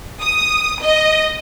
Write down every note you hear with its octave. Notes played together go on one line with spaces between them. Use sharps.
D#6
D#5